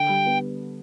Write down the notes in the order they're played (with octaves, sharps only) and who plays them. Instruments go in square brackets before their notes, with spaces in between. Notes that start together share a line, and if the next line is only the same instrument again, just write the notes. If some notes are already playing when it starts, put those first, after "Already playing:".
Already playing: [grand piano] D3 [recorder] G5
[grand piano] G3
B3